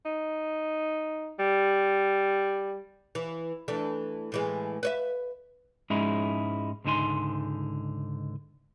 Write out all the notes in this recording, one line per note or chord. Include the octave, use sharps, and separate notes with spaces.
D#4
G3
E3
E3 A3 D4
A2 E3 G#3
B4 C#5 E5
G#2 G#3 C#4 D#4 E4 G#4
C#2 G#2 D3 D#4 G#5 C6